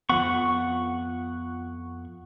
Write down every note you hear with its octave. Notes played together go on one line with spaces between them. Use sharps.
F2 F3 B3 F#5 C#6